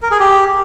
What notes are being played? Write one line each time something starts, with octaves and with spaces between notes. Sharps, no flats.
A#4
G#4
G4